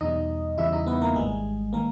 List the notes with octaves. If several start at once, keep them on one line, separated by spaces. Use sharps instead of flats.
E2 B2 G3 D#4 D#5
E2 C#3 E3 G3 E4 E5
D#4 D#5
B3 B4
A#3 A#4
G#1 G#2 G3 G#3 G#4
D#3 A#3 A#4